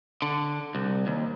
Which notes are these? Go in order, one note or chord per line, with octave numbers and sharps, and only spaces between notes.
D3
C2
D#2